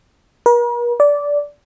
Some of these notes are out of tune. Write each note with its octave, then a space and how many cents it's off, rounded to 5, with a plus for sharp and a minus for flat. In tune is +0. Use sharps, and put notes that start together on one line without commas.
A#4 +45
D5 -15